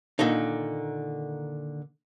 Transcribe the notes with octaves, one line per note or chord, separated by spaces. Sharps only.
A#2 D3 D#3 D#4